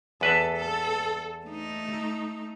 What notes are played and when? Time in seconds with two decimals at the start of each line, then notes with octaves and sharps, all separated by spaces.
0.21 E2 A4 B4 E5
0.56 A4
1.46 A3 D#4